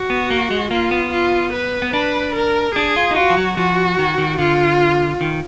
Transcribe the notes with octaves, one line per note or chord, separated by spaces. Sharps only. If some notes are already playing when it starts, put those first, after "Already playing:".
Already playing: F#4
B3
A#3
G#3
A#3 F4
B3
F4
B4
B3
D4 B4
A#4
D4 G#4
F4
D#4
F4 F#4
F3
F#3
F3 F#4
D#3
D#3
D3 F4
D#3